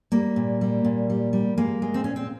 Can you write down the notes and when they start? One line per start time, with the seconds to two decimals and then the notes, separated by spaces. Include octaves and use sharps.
0.12 G3 A#3
0.36 A#2
0.61 G3
0.85 A#2
1.10 G3
1.33 G3
1.58 G#3 A#3
1.82 G#3
1.94 C4
2.04 A#2 C#4
2.16 C4